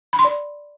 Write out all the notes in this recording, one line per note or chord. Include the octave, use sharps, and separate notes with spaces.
B5
C6
D5